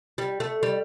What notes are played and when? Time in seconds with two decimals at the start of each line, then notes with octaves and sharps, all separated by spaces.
0.18 G3
0.40 A3
0.63 G3